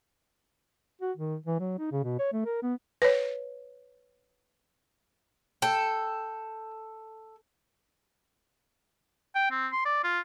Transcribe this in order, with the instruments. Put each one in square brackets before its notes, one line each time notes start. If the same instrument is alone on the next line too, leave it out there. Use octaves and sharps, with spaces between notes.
[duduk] F#4
D#3
E3
F#3
D#4
C#3
B2
C#5
A3
A#4
B3
[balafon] B4 C#5
[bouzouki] A4 [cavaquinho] G5
[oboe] G5
C4
C6
D5
F4